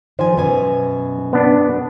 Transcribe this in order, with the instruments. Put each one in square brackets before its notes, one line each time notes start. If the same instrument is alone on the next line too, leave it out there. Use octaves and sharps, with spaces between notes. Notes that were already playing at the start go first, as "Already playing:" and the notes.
[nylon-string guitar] D#3 F3 G#5 [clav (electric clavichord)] C5
[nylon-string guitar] F#2 B2 G#5 [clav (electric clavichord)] B4
[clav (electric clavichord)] B3 D4